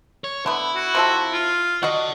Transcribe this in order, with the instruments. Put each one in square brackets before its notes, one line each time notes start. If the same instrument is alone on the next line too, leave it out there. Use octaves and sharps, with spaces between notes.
[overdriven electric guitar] C#5
[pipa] D3 B3 [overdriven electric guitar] E4
[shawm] F#4
[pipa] C3 F3 A4
[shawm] F4
[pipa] F#4 D#5 [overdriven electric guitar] D5 F#5